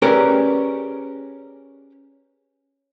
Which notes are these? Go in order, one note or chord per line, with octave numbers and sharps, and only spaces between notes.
C#4 G4 G#4 A#4 B4 D5